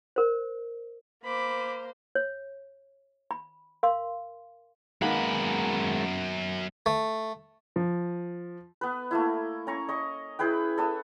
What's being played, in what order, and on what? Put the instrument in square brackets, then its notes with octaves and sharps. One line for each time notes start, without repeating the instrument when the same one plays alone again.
[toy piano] A#4 C5
[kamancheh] A#3 C5 [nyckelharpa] B5 D6
[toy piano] C#5
B5
A#4 F5 C6
[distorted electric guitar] F#2 B5 [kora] D#3 A#3 B3 [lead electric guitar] G#3 A#4
[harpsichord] A3
[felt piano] F3
[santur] B3 B4
A3 A#3 E4
C#4 A#5 C#6
D#5 C#6
E4 G#4 B4 G5
A4 E5 D#6